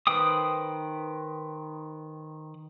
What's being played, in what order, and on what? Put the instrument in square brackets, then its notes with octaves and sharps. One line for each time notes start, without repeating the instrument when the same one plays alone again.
[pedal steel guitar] D#3 B4 C5 G5 D#6